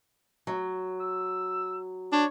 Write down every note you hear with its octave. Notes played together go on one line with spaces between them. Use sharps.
F#3
E6
D4 C#5